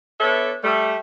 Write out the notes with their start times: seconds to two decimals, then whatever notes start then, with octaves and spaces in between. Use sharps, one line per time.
0.20 B3 D4 A4 C#5 E5
0.63 G3 A3